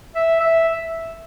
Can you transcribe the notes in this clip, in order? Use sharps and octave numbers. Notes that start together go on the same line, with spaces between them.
E5
E5